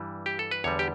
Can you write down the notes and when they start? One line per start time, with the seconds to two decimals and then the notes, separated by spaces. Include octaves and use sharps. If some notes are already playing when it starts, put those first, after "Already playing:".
Already playing: G2 E3 G3
0.26 G4
0.39 A4
0.51 B4
0.64 E2 D3 G3 C#5
0.79 G4